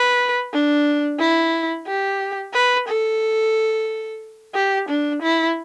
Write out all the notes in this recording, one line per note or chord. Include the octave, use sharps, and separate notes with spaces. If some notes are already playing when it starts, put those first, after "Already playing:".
Already playing: B4
D4
E4
G4
B4
A4
G4
D4
E4